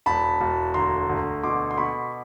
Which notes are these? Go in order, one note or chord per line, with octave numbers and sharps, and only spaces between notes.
E1 A5 B5
E1
D2 A#5 C6
D2
B2 C6 D6
C6
B2 B5 C#6